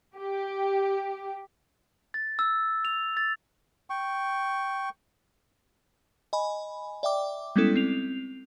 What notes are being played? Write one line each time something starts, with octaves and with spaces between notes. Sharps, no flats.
G4
A6
E6
F7
A6
G5 C#6
D#5 G#5 B5
D5 E5 G5 D6
G3 G#3 B3 C#4 E4 A4
C4 F7